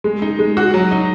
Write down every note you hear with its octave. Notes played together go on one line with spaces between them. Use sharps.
G#3
D#4
G#3
F#4
F#3
D#4